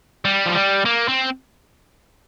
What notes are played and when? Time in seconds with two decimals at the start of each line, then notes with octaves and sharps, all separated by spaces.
0.25 G3
0.46 F3
0.55 G3
0.85 A#3
1.08 C4